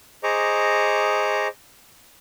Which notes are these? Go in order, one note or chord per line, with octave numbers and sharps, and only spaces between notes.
G#4 C5 D#5 A#5 C#6 D6